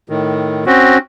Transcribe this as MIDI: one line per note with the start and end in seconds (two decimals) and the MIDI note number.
0.09 0.65 45
0.09 0.65 51
0.66 0.98 60
0.66 0.98 61
0.66 0.98 66